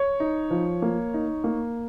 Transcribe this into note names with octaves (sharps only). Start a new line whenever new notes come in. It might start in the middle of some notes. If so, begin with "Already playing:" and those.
Already playing: C#5
D#4
F3
A#3
D#4
A#3